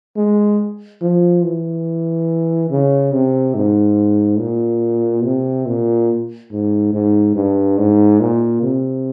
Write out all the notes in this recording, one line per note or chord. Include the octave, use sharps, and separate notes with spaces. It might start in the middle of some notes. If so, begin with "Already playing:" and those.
G#3
F3
E3
C#3
C3
G#2
A#2
C3
A#2
G#2
G#2
G2
G#2
A#2
C3